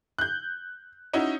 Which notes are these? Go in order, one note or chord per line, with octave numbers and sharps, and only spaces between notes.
F#6 G6
C#4 D#4 E4 F#4